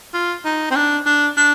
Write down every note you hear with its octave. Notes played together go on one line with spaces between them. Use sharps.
F4
D#4
C4
D4
D4
D4